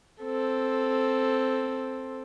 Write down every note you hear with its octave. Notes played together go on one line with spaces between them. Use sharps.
C4 A4